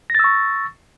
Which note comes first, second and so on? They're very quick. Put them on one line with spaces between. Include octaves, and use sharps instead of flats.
A#6 A6 E6 C#6